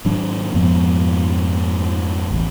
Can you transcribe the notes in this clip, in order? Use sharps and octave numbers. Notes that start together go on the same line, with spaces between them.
G#2 D#3 F#3 D4
F2 G#2 F3 B3
A1 E2